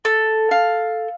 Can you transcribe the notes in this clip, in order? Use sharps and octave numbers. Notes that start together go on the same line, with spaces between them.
A4
F5